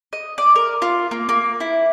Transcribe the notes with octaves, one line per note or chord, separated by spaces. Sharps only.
D#5
D5
A#4
F4
A#3
A#3
E4